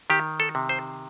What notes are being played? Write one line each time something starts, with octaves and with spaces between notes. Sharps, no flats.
D#3 G4
A4
C3
C5